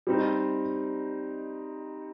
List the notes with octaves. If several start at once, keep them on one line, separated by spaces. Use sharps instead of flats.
G3 C4 D#4